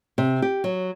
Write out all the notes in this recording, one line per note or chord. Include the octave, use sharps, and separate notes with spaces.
C3
G4
F#3